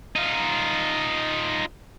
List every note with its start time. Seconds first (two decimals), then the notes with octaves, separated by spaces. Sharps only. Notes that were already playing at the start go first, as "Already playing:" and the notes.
0.16 D#4 F4